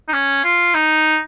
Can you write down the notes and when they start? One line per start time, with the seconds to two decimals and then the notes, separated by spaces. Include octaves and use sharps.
0.09 D#4
0.13 C#4
0.44 F4
0.75 D#4